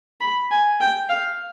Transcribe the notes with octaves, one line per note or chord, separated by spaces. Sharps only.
B5
G#5
G5
F5